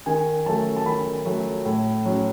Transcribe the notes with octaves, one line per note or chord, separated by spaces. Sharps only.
D#3 G#5
F#3 A3 A5
A5
D#3 B5
F#3 A3
A2
F#3 C#4